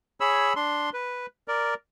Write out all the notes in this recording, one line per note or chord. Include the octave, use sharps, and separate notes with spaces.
G#4 C#5 B5 E6
D4 C6
B4
A#4 D5